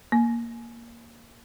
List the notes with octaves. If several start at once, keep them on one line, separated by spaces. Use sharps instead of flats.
A#3